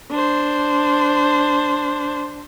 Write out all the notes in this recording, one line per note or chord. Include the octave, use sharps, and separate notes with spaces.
D4 C5